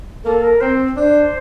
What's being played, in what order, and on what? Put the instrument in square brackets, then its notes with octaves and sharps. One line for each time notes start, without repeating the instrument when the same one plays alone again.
[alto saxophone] A#3 [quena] A4
[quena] A#4
[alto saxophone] C4 [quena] C5
[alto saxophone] D4 [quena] C5